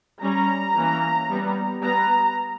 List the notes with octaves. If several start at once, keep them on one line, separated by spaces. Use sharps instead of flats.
G3 C#4 A#5
E3 A#3 C#4
G3 B3
G3 B3 A#5